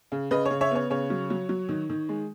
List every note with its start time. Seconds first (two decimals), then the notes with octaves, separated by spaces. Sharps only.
0.12 C#3
0.31 C#3 B4 D#5
0.45 C#5
0.50 C#3
0.61 C#5 E5
0.71 B3 C#5
0.90 C#3 C#5
1.10 F#3
1.30 F#3
1.49 F#3
1.69 D#3
1.90 D#3
2.09 G#3